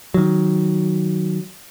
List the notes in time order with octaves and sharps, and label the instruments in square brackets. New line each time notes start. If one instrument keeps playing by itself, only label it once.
[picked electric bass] D#3 F#3